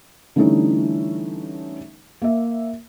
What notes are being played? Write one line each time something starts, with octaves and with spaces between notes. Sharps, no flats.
D3 E3 G3 A3 C#4 D#4
A#3 E5